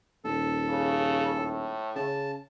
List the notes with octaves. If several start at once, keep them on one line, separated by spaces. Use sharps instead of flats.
D#1 A4
C#3
A2
C#3 A5